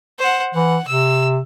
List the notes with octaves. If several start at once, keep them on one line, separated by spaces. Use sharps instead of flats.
C5 F#5
E3 F#5
C3 E6